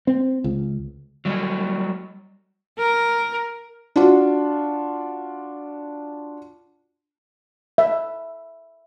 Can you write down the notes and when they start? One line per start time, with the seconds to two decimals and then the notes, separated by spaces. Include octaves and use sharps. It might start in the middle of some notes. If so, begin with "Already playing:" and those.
0.07 C4
0.44 C#2
1.25 F#3 G3 D#5
2.78 A#4
3.96 D4 F4 F#4
7.78 E5